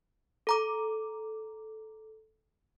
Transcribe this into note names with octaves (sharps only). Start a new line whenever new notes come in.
A4 A#5 D6